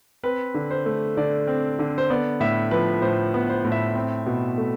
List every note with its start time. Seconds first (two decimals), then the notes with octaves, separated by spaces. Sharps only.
0.23 C4 B4
0.54 D3
0.71 C5
0.86 A3
1.17 D3 D5
1.47 C4
1.79 D3
1.98 C5
2.10 B3 D5
2.40 A2 E5
2.71 F3 B4
3.02 A2 C5
3.34 B3
3.50 C5
3.64 A2
3.72 E5
3.95 C4
4.26 B2
4.58 A3